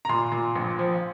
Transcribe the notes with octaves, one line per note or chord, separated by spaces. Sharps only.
A#5
A#2 C6
A#2
A#1
F3